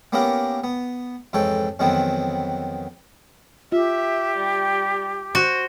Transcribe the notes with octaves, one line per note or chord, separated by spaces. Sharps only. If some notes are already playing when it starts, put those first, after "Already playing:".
A#3 B3 C#4 E4 G4 A#4
B3
F2 G#2 E3 A4 C#5 G5
F2 D#3 E3 F#3 B3 C4
F4 G4 E5
G3
F#4 C5